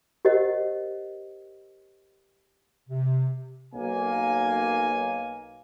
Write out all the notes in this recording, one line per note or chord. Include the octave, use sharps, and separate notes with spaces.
G4 A#4 C5 D#5 F#5
C3
B1 A#3 G#5